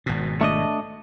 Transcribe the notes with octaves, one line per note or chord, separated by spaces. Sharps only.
G#1 B2
A3 D4 D#5